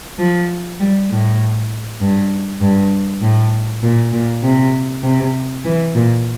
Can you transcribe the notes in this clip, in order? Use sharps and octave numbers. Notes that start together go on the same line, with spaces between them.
F3
G3
A2
G2
G2
A2
A#2
A#2
C3
C3
E3
A#2